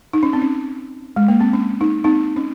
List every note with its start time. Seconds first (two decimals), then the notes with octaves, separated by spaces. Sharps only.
0.13 D#4
0.23 C#4
0.33 C4
0.42 C#4
1.16 G#3
1.28 A#3
1.40 C4
1.53 C#4
1.81 D#4
2.04 C4 D#4
2.36 C#4